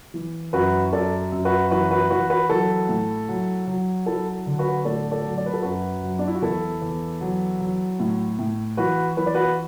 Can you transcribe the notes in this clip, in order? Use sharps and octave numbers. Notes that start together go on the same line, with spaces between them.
E3
F#2 F#4 B4
F#2 A4 D5
F#2
F#4 B4
E3 F#4 B4
F#4 B4
E3 F#4 B4
F#4 B4
F#3 E4 A4
A2
F#3
F#3
F#3 E4 A4
D3
F#4 B4
A2 A4 D5
A4 D5
F#3
D5
B4
A4
F#2 F#4 B4
F#3
D4
E4
F#4
E2 E4 A4
E2
F#3
F#3
A2
A2
E3 F#4 B4
E3 B4
D5
F#4 B4